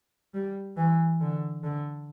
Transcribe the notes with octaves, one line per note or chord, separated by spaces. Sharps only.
G3
E3
D3
D3